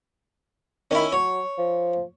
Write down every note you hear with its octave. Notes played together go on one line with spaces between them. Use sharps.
D#3 C#4 E4
F#3 C#5
F3